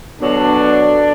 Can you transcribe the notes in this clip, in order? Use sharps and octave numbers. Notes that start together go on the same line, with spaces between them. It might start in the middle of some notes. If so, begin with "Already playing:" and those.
B2 D3 F#3 D4